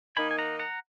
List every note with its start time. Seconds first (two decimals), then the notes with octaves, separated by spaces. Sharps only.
0.17 D#3 A#3 D#4 G#5 B5
0.31 G#5
0.39 F#5 A#5
0.59 F#5 A#5